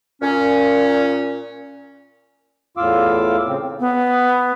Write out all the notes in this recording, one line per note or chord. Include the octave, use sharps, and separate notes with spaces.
A#2 C#4
E2 A2 F4 F5 D6 E6
C#3 C4
B3